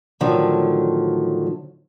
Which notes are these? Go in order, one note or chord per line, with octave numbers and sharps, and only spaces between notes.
A2 D3 D#3 F3 F#3 A3